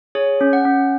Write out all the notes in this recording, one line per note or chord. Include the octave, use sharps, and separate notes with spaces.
G#4 C#5
C#4
F#5
C#4